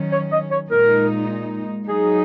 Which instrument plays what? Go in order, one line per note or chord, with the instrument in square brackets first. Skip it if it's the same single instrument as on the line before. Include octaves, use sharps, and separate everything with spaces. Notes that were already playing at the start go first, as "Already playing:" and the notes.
Already playing: [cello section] D#3 F#3 C#4
[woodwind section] C#5
D#5
C#5
[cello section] A#2 G#3 D#4 [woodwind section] A#4
[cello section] F#3 D#4 [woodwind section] G#4